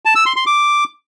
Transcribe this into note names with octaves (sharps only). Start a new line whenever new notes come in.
A5
E6
C6
C6
D6